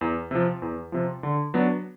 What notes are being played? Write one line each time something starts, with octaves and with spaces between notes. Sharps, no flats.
E2
C3 F3
E2
C3 F3
D3
F#3 B3 D4